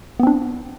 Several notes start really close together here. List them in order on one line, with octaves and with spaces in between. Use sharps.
B3 C4 D4